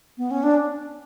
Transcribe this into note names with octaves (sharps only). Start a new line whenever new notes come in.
B3
C#4
D4